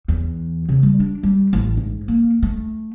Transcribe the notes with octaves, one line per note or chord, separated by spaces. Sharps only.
E2
C#3
G3
D4
G3
A1
G#2
A#3
A3